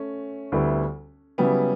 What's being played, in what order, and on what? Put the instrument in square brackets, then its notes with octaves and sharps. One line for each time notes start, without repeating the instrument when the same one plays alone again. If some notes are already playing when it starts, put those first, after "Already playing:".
Already playing: [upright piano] A3 C#4
[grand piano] D2 D3 G3 B3 E4
[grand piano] C#3 F#3 C#4 E4 [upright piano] G3 B3